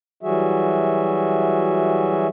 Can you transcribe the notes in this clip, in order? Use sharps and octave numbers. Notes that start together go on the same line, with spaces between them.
E3 F#3 G3 F#4 G#4 E5